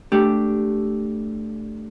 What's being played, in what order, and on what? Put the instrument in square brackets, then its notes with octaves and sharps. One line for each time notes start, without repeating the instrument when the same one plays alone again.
[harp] A3 D4 G4